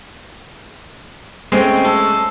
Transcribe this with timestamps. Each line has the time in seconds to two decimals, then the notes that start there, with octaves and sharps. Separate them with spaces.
1.52 G#3 A3 C4 C#4
1.85 A4